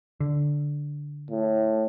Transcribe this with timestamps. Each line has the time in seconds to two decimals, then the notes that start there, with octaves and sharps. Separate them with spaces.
0.20 D3
1.31 A2